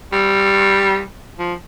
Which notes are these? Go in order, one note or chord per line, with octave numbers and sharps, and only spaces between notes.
G3
F3